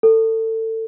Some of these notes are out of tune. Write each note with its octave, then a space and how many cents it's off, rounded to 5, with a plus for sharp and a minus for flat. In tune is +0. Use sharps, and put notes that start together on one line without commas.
A4 +25